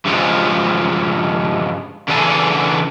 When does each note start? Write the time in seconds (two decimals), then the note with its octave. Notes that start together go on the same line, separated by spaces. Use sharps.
0.05 G2 C#3 F3 G#3
2.08 C#3 E3 D4 G#4 A4